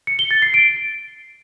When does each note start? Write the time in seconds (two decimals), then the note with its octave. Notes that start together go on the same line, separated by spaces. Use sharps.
0.07 C#7
0.19 G7
0.31 A6
0.42 C7
0.54 D7